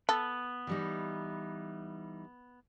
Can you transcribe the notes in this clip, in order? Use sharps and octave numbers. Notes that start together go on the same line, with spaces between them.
B3 A4
E3 G3 D#4